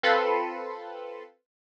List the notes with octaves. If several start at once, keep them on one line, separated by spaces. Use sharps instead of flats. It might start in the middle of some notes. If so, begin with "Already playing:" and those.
C4 F4 A4 B4 B5 C6